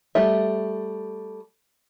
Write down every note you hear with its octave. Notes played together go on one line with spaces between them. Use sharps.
G3 A3 E5